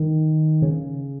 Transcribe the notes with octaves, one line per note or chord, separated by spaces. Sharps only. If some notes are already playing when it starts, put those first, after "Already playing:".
Already playing: D#3
C#3